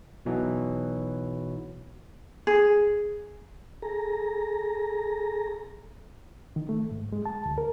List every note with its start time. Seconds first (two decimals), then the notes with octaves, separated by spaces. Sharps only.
0.25 B1 B2 E3 F#3
2.47 G#4
3.82 G#4 A4 A#5
6.56 D#3
6.69 A3
6.91 G#2
7.12 G#3
7.26 A5
7.46 D2
7.58 A#4